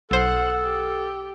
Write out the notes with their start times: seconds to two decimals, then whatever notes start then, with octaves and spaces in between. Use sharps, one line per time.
0.11 B1 A4 C5 F#5
0.63 G4